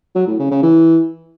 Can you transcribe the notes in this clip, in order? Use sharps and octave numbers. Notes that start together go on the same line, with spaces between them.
F#3
A2
C#3
C#3
E3